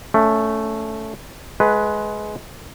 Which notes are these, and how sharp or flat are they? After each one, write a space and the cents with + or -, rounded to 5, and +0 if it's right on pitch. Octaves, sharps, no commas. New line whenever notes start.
A3 +0 C#4 +25
G#3 +20 B4 +0 F#5 -15